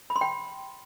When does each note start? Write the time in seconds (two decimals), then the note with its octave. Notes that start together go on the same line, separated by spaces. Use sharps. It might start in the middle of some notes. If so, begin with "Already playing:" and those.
0.10 B5
0.16 C6
0.21 G5